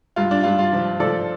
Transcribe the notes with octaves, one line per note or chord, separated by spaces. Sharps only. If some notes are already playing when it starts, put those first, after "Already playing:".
G2 F4
D4
G2 F4
F4
F3
F3 A4 D5